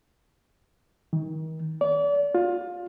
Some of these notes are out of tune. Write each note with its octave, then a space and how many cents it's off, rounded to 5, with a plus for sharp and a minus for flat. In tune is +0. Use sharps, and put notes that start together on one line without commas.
D#3 +35
D5 -35
F4 +25